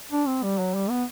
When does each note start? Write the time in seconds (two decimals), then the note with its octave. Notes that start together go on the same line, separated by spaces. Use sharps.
0.12 D4
0.27 C4
0.43 G3
0.58 F#3
0.74 G3
0.90 B3